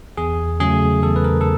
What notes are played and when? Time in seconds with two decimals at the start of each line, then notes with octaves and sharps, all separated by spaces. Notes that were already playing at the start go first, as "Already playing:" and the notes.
0.17 E2 G#4
0.60 C#3 F#3 A3 G#4
1.03 E2 A4
1.16 B4
1.24 A#4
1.41 A4